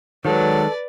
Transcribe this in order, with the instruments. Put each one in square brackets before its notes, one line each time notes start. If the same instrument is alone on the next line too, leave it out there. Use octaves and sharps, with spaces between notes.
[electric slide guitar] D#3 G#3 [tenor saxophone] F#3 [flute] A4 [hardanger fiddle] B4 D5